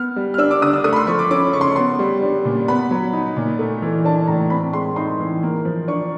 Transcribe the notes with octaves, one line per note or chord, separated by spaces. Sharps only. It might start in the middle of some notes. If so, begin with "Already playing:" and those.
Already playing: B3 F6
G3
F6
D4 E6
D6
D3 D#6
E6
A3 D#6
B5
C6
F3 C#6
D6
C#4 D6
C#3 C#6
C6
C#6
B3 C6
G3
D4
A#2
B3 B5
F#3
D#4
A#2
A3
E3
D4 A5
A2 A#5
C4 B5
G#3 C6
D#4 C6
E3
A#3
F3
D4 C#6